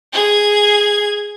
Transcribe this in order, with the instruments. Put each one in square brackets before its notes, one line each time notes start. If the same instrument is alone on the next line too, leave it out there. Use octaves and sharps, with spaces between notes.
[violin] G#4 G#6